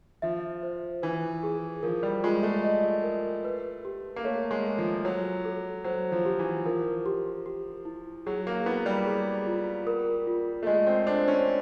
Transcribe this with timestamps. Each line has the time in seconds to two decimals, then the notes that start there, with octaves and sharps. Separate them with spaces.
0.22 F3 E5
0.63 C5
1.02 E3 B4
1.43 G#4
1.83 F3 A#4
2.03 G3
2.24 G#3 F4
2.43 A3
2.64 D#5
3.04 A#4
3.44 B4
3.85 G4
4.16 A#3
4.24 A3 C#5
4.51 G#3
4.65 A4
4.78 F3
5.04 F#3 C#5
5.45 A4
5.84 F#3 C5
6.12 F3
6.25 G4
6.39 E3
6.65 F3 A#4
7.06 G4
7.46 G4
7.85 E4
8.26 F#3 G#4
8.47 A#3
8.66 B3 E4
8.86 G3
9.06 G#4
9.46 F4
9.87 A#4
10.27 F4
10.63 A3
10.66 G#3 D#5
10.87 C4
11.07 D4 C5
11.28 C#4